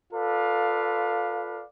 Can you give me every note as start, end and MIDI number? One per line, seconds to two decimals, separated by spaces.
0.13 1.65 65
0.13 1.65 69
0.13 1.65 71
0.13 1.65 74
0.13 1.65 77